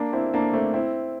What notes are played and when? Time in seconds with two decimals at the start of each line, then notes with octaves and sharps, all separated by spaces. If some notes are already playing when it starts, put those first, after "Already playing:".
Already playing: A#3 D4
0.13 C4 E4
0.34 A#3 D4
0.53 A3 C4
0.74 C4 E4